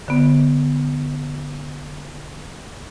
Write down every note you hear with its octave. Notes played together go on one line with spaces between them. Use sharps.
D3 B3